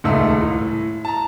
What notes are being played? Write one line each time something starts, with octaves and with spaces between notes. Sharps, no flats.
D#1 C#2 G#2 A3 E6
A2
A5 A#5